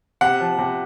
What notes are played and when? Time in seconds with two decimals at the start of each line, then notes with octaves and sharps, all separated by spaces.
0.21 C3 F#5
0.40 F3
0.58 C3